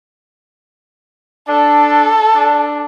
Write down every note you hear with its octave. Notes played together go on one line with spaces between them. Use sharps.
D4 A4
D4